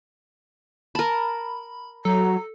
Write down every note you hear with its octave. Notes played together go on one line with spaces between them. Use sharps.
A#4 A5 B5
F#3 A4 A#5